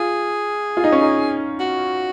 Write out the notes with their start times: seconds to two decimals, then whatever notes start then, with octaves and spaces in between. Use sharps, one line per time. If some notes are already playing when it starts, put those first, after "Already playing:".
Already playing: F4 G#4
0.77 F4
0.84 D#4
0.92 C#4
1.01 D#4
1.60 F#4